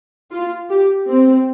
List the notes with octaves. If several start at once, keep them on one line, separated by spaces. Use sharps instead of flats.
F4
G4
C4